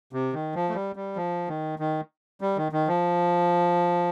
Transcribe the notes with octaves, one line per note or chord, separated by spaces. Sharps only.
C3
D#3
F3
A3
G3
G3
F3
D#3
D#3
G3
D#3
D#3
F3